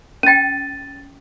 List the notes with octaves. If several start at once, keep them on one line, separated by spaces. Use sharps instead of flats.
C#4 G5 A6 D#7